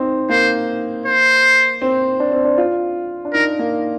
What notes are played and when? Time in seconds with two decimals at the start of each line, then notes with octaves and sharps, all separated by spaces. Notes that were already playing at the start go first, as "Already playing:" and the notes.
Already playing: C4 D#4
0.30 A#3 C5
1.06 C5
1.82 C4
2.20 D4
2.32 C4
2.44 D4
2.58 F4
3.25 D4
3.34 D#4 A#4
3.59 A#3